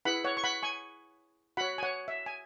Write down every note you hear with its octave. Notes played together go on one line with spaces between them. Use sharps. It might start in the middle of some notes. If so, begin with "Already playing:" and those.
E4 G#4 B4 F#5 B5
C#5 F#5
C#6
F#5 B5
G#5 C#6
F#4 C#5 F#5 B5
G#5
C#5 F#5
E5
G#5